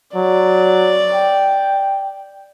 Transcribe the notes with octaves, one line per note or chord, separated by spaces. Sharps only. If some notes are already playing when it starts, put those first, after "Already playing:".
F#3 D5
G5